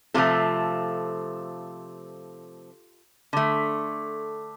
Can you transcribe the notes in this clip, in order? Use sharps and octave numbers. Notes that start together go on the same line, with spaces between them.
C3 F3 A3 F4 A4
D3 A3